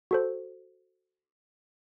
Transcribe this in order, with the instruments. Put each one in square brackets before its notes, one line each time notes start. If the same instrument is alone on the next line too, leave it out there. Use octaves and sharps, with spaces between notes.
[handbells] F#4 A4 C5